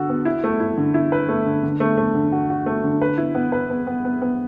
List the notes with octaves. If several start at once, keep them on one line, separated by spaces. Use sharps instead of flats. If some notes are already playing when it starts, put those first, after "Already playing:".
Already playing: D3 F#4 A4
B3
E4
A3
E4
D3
E4
B4
A3
D3
D3
A3
A3
D3
F#4
F#4
A3
D3
B4
E4
B3
B4
B3
B3
B3
B3